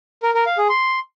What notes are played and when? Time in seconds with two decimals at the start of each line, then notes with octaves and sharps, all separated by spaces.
0.23 A#4
0.34 A#4
0.46 F5
0.58 G#4
0.69 C6